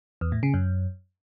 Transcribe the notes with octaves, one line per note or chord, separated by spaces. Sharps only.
E2
A2
C#3
F#2